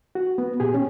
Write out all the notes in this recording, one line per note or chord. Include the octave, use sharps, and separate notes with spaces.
F#4
B3
A#2 G4 G#4
C#4